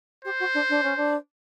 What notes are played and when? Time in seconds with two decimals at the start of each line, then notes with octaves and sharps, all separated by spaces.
0.24 G4 C5
0.39 F#4
0.54 D4
0.69 D4
0.83 C#4
0.97 D4